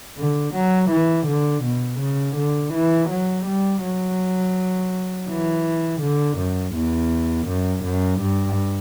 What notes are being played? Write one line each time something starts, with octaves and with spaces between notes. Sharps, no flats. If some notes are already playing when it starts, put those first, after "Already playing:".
D3
F#3
E3
D3
B2
C#3
D3
E3
F#3
G3
F#3
E3
D3
F#2
E2
F#2
F#2
G2